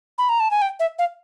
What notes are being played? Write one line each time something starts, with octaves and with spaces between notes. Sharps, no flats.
B5
A#5
A5
G#5
G5
E5
F5